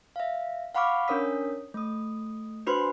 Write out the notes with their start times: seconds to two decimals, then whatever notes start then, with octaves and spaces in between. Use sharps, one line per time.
0.16 E5 F5
0.74 F5 F#5 B5 C#6 D6 F6
1.08 C#4 D4 A#4 C#5 D#6 B6
1.74 A3 D#6
2.66 D4 F#4 B4 C5 B5 C6